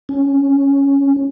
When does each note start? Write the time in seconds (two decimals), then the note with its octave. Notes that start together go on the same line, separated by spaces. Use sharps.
0.09 C#4